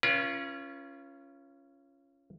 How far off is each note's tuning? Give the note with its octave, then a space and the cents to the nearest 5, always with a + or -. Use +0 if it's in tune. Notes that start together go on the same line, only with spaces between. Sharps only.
C#4 +0 F4 -30 B4 -40